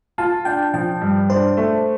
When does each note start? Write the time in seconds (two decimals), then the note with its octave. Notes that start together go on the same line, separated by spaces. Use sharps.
0.18 F4 A5
0.45 D4 G5
0.74 F3 G5
1.01 G2
1.30 D4 C5
1.57 A3